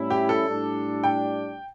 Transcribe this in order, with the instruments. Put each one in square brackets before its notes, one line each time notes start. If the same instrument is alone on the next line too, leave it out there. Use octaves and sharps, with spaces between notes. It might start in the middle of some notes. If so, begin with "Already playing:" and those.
Already playing: [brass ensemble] A2 G3 C#4 E4
[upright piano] G4
A4
[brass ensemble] A2 G3 D4
[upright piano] G5